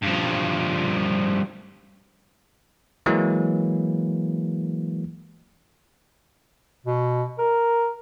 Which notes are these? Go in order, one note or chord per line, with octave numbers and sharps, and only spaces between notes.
G2 F3
E3 F#3 G#3 A#3
B2
A#4